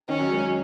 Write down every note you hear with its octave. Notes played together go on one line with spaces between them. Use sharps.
D#3 C#4
F#3
G#3
F#3